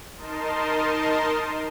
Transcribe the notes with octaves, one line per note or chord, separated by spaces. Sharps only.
D#4 A#4 D#5 A5 C6